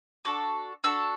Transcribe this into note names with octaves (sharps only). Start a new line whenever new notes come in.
D4 F#4 A4 D6
D4 F#4 A4 E6